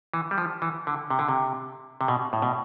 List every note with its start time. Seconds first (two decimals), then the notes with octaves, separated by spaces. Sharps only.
0.14 E3
0.31 G3
0.38 F3
0.62 E3
0.87 D3
1.10 C3
1.19 D3
1.29 C3
2.01 C3
2.08 B2
2.33 A2
2.42 B2